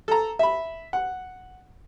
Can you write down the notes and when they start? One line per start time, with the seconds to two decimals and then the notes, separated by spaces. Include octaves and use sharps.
0.08 A4 A#5
0.39 E5 B5
0.93 F#5